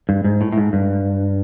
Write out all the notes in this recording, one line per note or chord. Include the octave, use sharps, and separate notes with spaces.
G2
G#2
A2
A2
G#2
G2